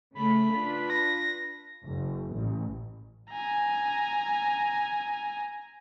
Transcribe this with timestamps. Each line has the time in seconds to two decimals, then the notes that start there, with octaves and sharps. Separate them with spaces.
0.15 C#3 A3 B5
0.51 D4 F4 B4
0.90 A#6
1.85 F#1
2.35 A1
3.32 G#5 A#5